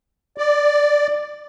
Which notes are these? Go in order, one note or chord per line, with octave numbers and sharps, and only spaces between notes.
D5